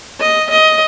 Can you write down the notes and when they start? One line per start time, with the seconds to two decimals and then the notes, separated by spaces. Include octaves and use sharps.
0.21 D#5
0.51 D#5